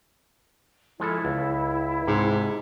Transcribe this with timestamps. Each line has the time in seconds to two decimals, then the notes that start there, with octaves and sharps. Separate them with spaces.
1.00 F3 G#3 E4 A4
1.25 C#2
2.07 G#2 C3